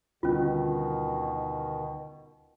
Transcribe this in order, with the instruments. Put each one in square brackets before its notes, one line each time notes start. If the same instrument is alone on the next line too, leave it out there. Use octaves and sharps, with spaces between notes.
[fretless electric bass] D2 D3 G3 [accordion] B2 D#3 [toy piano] C#4 F4